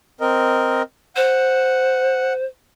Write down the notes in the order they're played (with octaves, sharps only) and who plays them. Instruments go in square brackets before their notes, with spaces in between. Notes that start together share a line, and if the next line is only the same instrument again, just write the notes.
[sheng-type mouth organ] C4 A#4 D#5
[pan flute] C5 [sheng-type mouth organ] F#5